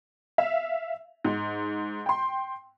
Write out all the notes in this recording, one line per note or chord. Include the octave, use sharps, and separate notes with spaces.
E5 F5
G#2
G5 C6